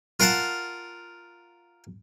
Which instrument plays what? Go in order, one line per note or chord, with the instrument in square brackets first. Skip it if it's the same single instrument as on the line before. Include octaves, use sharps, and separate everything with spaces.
[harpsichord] F4 A#4 F5 F#5 A5